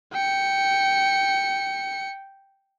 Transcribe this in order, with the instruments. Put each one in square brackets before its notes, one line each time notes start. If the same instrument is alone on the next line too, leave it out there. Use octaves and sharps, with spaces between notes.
[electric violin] G5 C#7